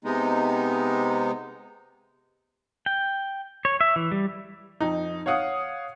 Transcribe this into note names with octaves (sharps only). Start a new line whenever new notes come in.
C3 G#3 B3 D#4
G5
C#5
E5
E3
G3
F2 D#4
C#5 F5 F#5 D#6